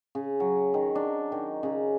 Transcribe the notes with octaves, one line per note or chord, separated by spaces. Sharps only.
C#3
F#3
D#3
D4
D#3
C#3